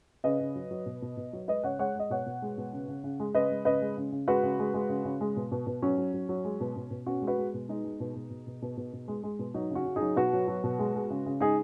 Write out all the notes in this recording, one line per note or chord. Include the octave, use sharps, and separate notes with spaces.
C#3 B4 D#5
C#3
F#3
F#3
B2
B2
B2
F#3
G#3 B4 D#5
C#3 C#5 F#5
G#3 C#5 F#5
G#3 D#5
B2 C#5 F#5
B2
G#3
B2
C#3
C#3
C#3
G#3
C#3 B4 D#5
G#3
C#3 B4 D#5
G#3
C#3
C#3
G#3 F#4 B4
C#3
G#3
G#3
C#3
C#3
G#3
B2
B2
B2
F#3 C#4
F#3
F#3
F#3
G#3
B2
B2
B2
B2 C#4 F#4
G#3
F#4 B4
G#3
B2
G#3 D#4 G#4
G#3
B2
B2
B2
B2
B2
B2
B2
G#3
G#3
B2
F#3 D#4
C#3
C#4 F#4
C#3
D#4 G#4
F#3
B2 F#4 B4
F#3
F#3
B2
G#3
G#3
C#3
C#3
G#3 D#4 G#4